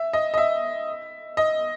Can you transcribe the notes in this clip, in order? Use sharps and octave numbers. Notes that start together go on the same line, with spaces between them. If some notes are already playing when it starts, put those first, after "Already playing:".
Already playing: E5
D#5
D#5
E5
D#5